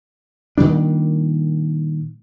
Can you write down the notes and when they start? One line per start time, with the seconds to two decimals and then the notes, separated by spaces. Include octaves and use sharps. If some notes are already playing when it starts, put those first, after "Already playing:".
0.58 A#2 D#3 G3 D4